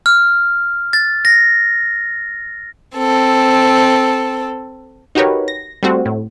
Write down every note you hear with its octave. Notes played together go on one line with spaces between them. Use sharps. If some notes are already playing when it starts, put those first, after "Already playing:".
F6
A6
A#6
C4 A4
D#4 F#4 G4 A#4 B4 C#5
A#6
G3 A3 C4 F#4
A2